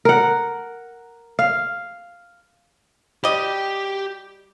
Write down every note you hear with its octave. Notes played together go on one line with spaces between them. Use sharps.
A#4 F#5
F5
G3 G4 D#5 G5